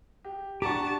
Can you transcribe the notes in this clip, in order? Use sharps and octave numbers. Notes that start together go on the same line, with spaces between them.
G4
D4 G4 F#5 A5 A#5 C#6